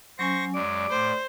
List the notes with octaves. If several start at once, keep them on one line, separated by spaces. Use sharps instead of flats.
F#3 C#4 C5 G#5 C#6 A#6
F#2 G#3 D5 D6
A2 C5